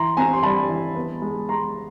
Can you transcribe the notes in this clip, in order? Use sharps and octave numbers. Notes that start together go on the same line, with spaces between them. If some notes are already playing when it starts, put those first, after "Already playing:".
Already playing: E3 A#5 C6
C4 G#5 A#5
C6
G3 A5 B5
E3
B3
G#3
G#3 A#5 C6